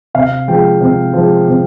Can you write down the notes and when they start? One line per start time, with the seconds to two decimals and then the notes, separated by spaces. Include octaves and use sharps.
0.15 C3 F5
0.48 F3 G#3 G5
0.81 C3
1.14 F3 G#3
1.47 C3